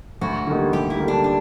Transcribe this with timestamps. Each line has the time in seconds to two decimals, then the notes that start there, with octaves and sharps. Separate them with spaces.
0.21 D2 F#4
0.47 D3 G3 A#3 D#4
0.72 D2 G4
0.90 E4
0.99 D3 G3 A#3 D#4
1.08 D4
1.24 D4